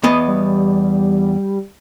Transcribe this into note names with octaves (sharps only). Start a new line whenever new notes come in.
E2 B3 D#5
G3